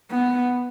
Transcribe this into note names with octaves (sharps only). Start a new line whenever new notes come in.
B3